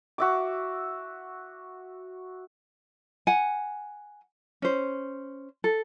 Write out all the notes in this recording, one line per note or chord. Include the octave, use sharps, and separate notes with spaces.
F#4 E5 D6
F#5 G#5
C#4 C5
A4